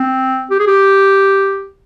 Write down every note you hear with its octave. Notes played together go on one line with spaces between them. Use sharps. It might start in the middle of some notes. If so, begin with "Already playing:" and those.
Already playing: C4
G4
G#4
G4